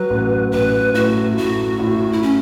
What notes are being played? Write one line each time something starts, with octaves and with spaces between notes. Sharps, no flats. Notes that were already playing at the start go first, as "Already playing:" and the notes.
Already playing: F#3 B4
A1
A1 B4
A2 F#4
A2 F#4
A2
E4
C#4